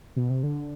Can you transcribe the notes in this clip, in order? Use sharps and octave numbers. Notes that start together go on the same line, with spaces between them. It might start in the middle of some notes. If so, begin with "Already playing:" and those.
B2
C3
D3